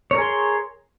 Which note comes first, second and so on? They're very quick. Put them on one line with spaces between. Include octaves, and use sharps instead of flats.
C#5 A#4 G#4 C6